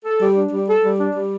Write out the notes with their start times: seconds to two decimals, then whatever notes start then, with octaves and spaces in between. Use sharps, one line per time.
0.05 A4
0.21 G3
0.36 D4
0.51 G3
0.68 A4
0.84 G3
1.00 D4
1.15 G3